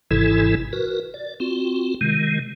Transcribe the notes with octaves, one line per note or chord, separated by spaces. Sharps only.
G#1 G#2 C3 E3 E4 A4
F#4 A#4 B4
D5
C4 F4 F#4
C3 D#3 G#3